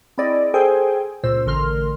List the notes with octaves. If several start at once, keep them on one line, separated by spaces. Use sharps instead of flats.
C4 E4 G#4 D5 D#5
G#4 A4 C5 G5 G#5
C#2 A#2 C5 E6
A1 D3 A#4 C6 F6